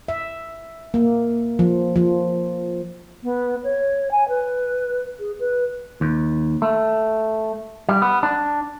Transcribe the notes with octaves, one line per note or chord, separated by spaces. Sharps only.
E5
A#3
F3
F3
B3
C#5
G#5
B4
G#4
B4
D#2
A3
G3
B3
D4